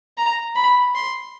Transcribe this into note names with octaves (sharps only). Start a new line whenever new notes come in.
A#5
B5
C6